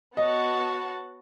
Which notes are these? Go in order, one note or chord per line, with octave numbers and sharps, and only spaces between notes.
B3 F#4 C#5 D#5 F#5 A5